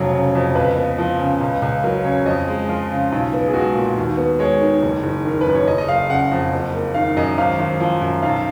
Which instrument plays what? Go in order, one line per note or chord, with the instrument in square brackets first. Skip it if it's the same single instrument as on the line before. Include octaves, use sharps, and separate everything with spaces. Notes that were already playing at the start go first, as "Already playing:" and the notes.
Already playing: [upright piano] F1 C#3 F#3 C#5
C#3
F2
C#2 B4
B3
F3
C#3
C#2
C#2
F#3 A#4
C#3 C#5
F2 D#5
G#3
F3 F4
C#3
B1
B3
G#4
G#3 F#4
A#2
D#2
B3
G#3 C#5
D#3
F#1
F#1
D#3 A#4
B4
F#2
C#5
F#1 D#5
D#5
F#1 F5
C#3 F#5
F2
F#1
A#3
D#3 F5
F#2 D#5
G#1 F5
G#1
F3
F#2
B1 F5